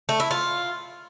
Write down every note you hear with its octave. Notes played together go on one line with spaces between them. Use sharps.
A3
E4
F4